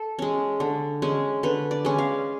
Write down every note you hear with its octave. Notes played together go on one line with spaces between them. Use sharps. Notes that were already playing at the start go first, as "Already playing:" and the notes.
Already playing: A4
G#3 C#4
D3
G#3 C#4
D3 B4
D5
G#3 C#4
F5